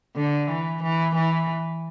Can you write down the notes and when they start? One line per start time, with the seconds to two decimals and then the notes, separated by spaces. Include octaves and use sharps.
0.16 D3
0.49 E3
0.83 E3
1.15 E3